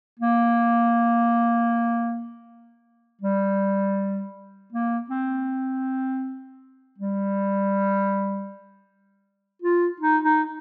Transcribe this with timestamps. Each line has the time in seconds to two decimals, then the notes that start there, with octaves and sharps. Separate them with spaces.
0.19 A#3
3.22 G3
4.72 A#3
5.10 C4
6.98 G3
9.62 F4
10.00 D#4
10.24 D#4